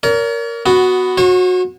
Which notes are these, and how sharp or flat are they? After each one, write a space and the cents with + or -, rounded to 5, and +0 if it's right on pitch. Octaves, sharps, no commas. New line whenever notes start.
A#4 +0 C#5 +45
B3 +10 F#4 +0
F#4 -20 C#5 -45